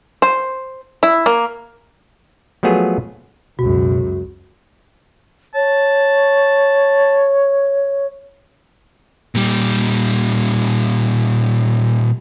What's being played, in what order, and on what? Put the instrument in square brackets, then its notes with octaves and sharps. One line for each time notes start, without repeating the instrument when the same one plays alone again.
[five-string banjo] C5
E4
A#3
[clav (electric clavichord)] F3 F#3 A3 B3 G#4
[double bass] C#2 F#2 [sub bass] B2 [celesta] F#4
[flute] C#5 [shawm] A5
[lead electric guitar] A#2 G3